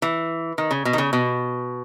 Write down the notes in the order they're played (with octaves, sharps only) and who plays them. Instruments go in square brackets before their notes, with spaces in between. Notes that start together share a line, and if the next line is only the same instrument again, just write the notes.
[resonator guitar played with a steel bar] E3
D#3
C#3
B2
D#3
C#3
B2